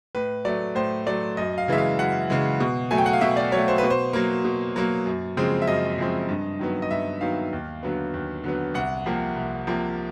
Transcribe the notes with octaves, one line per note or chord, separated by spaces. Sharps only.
A2 B4
F#3 A3 D5
A2 C5
F#3 A3 D5
F#2 D#5
F5
C#3 E3 G#3 E5
F5
F#2 F#5
C#3 E3 G#3
B2
F#3 A3 G#5
G5
F#5
F5
B2 E5
D5
F#3 C#5
A3
C5
B4
B2
C5
F#3 A#3
B2
F#3 A#3
F#2
C#3 F3 G#3 C4
E5
F#2 D#5
C#3 F3 G#3 C4
G2
D#3 F#3 B3
D#5
G2 E5
D#3 F#3 B3 F5
D#2
D3 F#3 B3
D#2
D3 F#3 B3
C2 F#5
C3 F3 A#3
C2
C3 F3 A#3